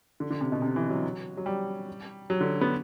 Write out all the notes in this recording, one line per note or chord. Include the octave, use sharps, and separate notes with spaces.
D3
D3
C3
B2
C3
E3
F#3
F#3
G3
F#3
D3
B3